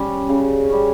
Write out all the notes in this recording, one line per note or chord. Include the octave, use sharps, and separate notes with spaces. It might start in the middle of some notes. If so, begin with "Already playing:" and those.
Already playing: G3 C#4
C#3
G3 C#4